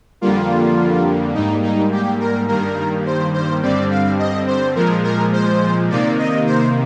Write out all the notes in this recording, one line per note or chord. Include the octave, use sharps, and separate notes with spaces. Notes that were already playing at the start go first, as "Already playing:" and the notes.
F2 D3 G3 A#3 F4
G#2 G3 A#3 D#4
D#4
G4
A#4
G2 D#3 G3 A#3 A#4
C5
C5
G2 D3 G3 C4 D5
F5
D#5
C5
A#2 F3 G#3 A#4
A#4
C5
C3 D#3 A#3 D5
D#5
C5